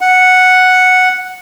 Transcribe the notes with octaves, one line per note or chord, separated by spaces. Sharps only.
F#5